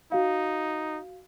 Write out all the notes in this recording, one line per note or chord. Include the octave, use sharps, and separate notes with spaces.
D#4 F#4 F5